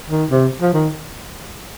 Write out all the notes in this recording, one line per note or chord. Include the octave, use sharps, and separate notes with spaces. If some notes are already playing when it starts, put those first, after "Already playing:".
D#3
C3
F3
D#3